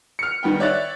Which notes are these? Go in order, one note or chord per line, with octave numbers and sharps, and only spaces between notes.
F6 C#7
D#3 G3 B3 G5
C#5 D5 E5 F#6 A6